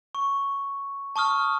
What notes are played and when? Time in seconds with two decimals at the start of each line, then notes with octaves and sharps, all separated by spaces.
0.15 C#6
1.16 A5 C#6 D#6 F6